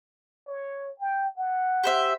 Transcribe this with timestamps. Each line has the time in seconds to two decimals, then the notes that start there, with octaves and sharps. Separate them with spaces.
0.48 C#5
1.00 G5
1.37 F#5
1.84 G4 C5 E5